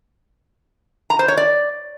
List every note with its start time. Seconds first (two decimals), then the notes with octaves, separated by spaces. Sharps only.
1.10 A#5
1.19 C5
1.28 C#5
1.37 D5